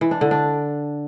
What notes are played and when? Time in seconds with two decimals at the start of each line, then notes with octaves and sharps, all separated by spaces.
0.01 E3
0.11 D4
0.21 D3
0.31 D4